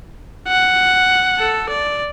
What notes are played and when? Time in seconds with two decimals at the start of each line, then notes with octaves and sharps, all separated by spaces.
0.48 F#5
1.39 A4
1.69 D5